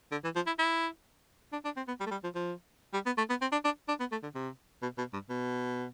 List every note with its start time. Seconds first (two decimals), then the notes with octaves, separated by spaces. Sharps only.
0.12 D3
0.24 E3
0.35 F3
0.47 E4
0.59 E4
1.53 D4
1.65 D4
1.77 C4
1.88 B3
2.00 G3
2.06 A3
2.11 G3
2.24 F3
2.35 F3
2.93 G3
3.06 B3
3.18 A3
3.30 B3
3.41 C4
3.52 D4
3.65 D4
3.88 D4
4.00 B3
4.12 A3
4.23 D3
4.35 C3
4.82 B2
4.98 B2
5.13 G2
5.29 B2